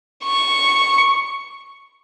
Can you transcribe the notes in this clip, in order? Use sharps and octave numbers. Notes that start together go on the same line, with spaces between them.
C#6